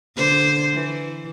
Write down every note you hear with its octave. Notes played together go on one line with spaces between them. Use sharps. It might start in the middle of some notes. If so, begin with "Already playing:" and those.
D3 C5
E3